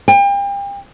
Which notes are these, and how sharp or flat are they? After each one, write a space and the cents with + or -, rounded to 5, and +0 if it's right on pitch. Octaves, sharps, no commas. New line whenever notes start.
G5 +35